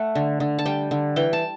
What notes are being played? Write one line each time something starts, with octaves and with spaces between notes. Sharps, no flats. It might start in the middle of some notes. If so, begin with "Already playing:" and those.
Already playing: A3 F#5
D3
D3
A5
G3 G5
D3
E3 G5
A5